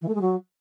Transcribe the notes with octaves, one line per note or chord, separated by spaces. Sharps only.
E3
A3
G#3
F#3